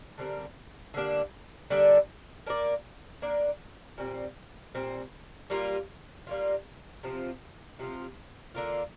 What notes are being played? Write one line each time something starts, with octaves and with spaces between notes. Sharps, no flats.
D3 G3 C4 A#4
D3 G3 A#3 D4
D3 G3 A#3 D4
A#3 D4 A#4 D5
A#3 D4 A#4 D5
A#2 G3 C4
A#2 G3 C4
G3 A#3 F4
G3 A#3 F4
C3 F3 C4 F4
C3 F3 C4 F4
D3 A#3 F4